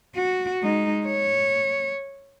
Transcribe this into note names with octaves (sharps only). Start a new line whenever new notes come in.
F#4
G#3 D#4
C#5